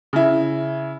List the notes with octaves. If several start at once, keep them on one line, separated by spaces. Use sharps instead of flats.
C#3 E4